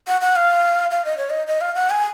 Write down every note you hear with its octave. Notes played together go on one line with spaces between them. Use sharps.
F#5
F#5
F5
F5
D#5
C#5
D#5
D#5
F5
F#5
G#5